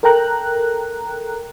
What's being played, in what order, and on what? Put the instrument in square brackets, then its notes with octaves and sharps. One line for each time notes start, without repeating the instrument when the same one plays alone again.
[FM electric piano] A4 A#4 G5 A#5 F#6